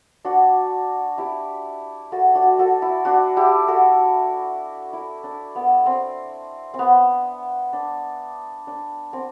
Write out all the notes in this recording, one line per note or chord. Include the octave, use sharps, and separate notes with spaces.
D4 F#4
E4 G4
F#4 A4
D4 F#4
F#4 A4
E4
D4 F#4
E4 G4
F#4 A4
E4
D4
B3
C4
C4
B3
D4
D4
C4